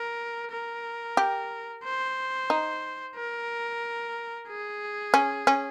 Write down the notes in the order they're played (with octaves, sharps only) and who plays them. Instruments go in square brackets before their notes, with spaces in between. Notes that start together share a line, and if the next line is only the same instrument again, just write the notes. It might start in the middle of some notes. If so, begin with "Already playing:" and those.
Already playing: [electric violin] A#4
A#4
[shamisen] G4
[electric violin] C5
[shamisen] D#4
[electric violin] A#4
G#4
[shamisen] C#4
C#4